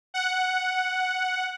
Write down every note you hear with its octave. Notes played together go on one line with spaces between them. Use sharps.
F#5